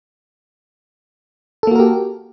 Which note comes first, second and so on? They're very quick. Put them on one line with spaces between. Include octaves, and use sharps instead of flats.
A4 A#3 F#4 A#4 G4